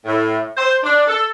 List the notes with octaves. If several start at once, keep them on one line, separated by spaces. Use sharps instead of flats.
A2
C5
D4
A4